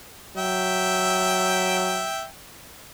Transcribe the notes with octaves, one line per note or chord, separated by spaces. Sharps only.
F#3 E5 G5